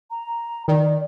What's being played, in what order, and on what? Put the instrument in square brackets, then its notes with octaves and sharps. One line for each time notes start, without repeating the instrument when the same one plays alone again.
[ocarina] A#5
[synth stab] D#3 [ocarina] D5